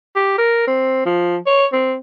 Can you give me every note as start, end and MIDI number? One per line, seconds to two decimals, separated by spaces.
0.16 0.35 67
0.38 0.67 70
0.67 1.02 60
1.05 1.37 53
1.46 1.66 73
1.72 1.95 60